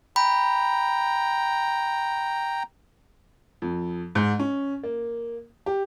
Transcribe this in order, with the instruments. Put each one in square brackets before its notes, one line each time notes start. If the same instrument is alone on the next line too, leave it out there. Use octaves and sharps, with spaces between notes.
[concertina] G5 A#5 [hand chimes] B5
[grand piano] F2
G#2
C#4
A#3
G4